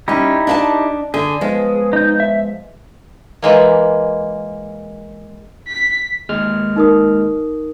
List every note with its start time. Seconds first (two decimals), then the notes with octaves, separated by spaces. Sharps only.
0.08 G3 C#4 D#4 E4 G4
0.47 D4 E5 A5
1.14 D3 G#4
1.41 F3 G#3 B3
1.93 D#4 G6
2.20 E5
3.42 E3 G#3 A#3
5.68 B6
6.29 D#2 G#3 F6
6.76 D#4 A#4 D#6